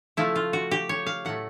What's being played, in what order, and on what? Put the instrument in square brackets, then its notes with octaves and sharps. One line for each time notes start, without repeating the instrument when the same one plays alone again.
[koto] C#3 F3 A3 E4
F4
F#4
G4
C#5
F5
A2 F#3 A3 F#5